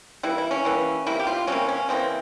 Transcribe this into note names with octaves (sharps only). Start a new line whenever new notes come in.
E3 G3 A#3 E4
E4
C#4
E3 G3 A#3
C3 G3 A#3 E4
G4
F4
C3 G3 A#3 C#4
C#4
C#3 E3 A#3 C4